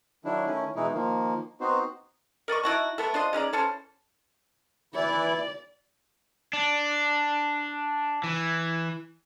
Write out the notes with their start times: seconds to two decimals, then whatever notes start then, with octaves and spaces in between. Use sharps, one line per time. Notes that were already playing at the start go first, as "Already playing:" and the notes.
0.25 D#3 F#3 D4 E4
0.46 D#3 A3 C#4 E4
0.76 B2 E3 G#3 D#4 E4
0.94 D#3 F3 A#3
1.61 B3 C4 D#4 F#4 C5
2.48 A#4 D5 D#5 C#6
2.63 D#4 E4 F#4 A5
2.98 A3 B3 A4
3.14 D4 F4 C5 D#5
3.33 G#3 C#4 D#4 D5
3.53 E3 C#4 A4 C5
4.94 E3 E4 D5
6.53 D4
8.24 E3